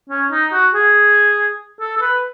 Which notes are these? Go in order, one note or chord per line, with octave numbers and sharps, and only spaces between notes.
C#4
D#4
F#4
G#4
A4
A4
B4